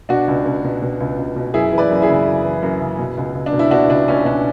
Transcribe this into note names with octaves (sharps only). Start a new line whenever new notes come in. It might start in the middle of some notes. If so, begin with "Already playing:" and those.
B2 D4 F#4
C#2
C#2
B2
B2
C#2
C#2
B2
F#2 E4 G#4
E3
B4 D5
F#2
E4 G#4
C#3
F#2
E3
F#2
C#3
B2
C#2
C#2
D4
B2
E4
B2 D4 F#4
C#2 D4
C#2 C#4
B2 D4